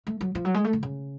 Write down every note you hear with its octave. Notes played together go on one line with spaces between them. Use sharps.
A3
F#3
F3
F#3
G#3
A3
D3
C#3